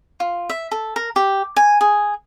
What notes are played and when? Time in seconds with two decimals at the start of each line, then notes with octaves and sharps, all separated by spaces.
0.20 F4
0.49 E5
0.71 A4
0.96 A#4
1.16 G4
1.56 G#5
1.81 G#4